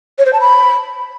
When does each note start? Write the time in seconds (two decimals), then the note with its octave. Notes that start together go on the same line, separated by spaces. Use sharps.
0.18 C#5
0.26 C5
0.33 A5
0.40 B5